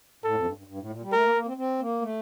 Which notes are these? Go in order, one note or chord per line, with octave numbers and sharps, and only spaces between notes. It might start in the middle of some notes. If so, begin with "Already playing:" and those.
A2 A4
F2
G2
G2
G2
A2
A#2
G3
A3 A#4
A#3
A#3
C4
C4
A#3
A3